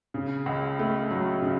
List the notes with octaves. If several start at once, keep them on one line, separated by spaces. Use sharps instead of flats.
C#3
C#2
A3
F#3
C#3